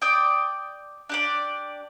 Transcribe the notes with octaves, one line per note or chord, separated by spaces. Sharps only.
D5 G5 D6 D#6
D4 G4 D5